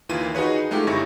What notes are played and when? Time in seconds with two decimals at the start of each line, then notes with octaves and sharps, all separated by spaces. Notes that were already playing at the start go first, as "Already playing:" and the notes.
0.09 D#2 E3 A#3 F4 D#7
0.35 D#4 F#4 G#4 B4 C#5
0.71 G#3 A3 D#4 F4 G4
0.87 G1 C#4 E4 G#5 C#6 A#6